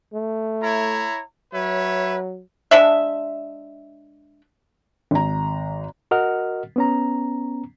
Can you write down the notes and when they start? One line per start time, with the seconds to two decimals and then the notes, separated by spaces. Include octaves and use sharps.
0.13 A3
0.62 E4 C#5 A#5
1.54 F#3 B4 C#5 E5
2.71 G#3 D4 E5
5.11 G#1 A#5
6.11 F#4 A#4 D#5 F#5 F6
6.76 B3 C#4 A#5